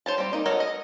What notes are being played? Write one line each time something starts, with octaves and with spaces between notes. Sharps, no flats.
C5 C#5 A5
G3 C4
A#3 D#4
F#4 A4 A#4 C#5 D#5
D#5